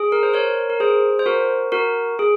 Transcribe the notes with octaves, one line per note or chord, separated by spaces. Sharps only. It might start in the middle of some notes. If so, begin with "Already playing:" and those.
Already playing: G#4
A#4
C5
A#4 C#5
A#4
G#4 C5
C5
F#4 A#4
F#4 A#4
G#4